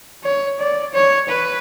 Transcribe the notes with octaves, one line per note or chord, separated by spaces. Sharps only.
C#5
D5
C#5
B4